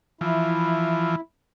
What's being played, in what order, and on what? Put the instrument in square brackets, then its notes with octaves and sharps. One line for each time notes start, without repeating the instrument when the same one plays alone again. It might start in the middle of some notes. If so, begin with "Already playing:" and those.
[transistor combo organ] E3 F3 [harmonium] E4